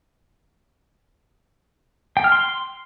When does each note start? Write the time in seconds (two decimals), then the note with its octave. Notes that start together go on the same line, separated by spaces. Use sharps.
2.17 G5
2.24 F6
2.32 C6